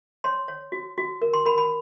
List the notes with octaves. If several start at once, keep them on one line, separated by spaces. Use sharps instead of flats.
C#5 C6
C#5
F#4
F#4
A#4
C6
A#4 B5
B5